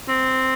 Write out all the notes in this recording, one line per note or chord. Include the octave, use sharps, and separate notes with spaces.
C4